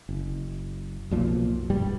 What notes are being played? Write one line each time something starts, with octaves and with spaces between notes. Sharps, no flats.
F#1
B1 F#2 A#2 F3
E1 G2 G3